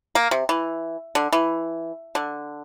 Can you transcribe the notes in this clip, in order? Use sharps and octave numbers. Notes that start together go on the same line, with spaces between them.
A#3
C3
E3
D3
E3
D3